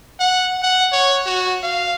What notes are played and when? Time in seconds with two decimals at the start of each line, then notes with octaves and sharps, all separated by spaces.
0.20 F#5
0.63 F#5
0.92 C#5
1.26 F#4
1.63 F5